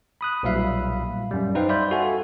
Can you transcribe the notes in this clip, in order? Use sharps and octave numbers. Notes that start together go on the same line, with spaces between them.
B5 D#6 F#6
B1 A#2 G3 E5 F5 B5
F#2 G3
D#4 B4 C5 F5 G5
D5 E5 F5 B5 C6 G6
F#4 A4 E5 F#5 G#5